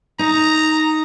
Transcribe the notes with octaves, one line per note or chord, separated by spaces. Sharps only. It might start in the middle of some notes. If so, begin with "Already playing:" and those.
D#4 A#5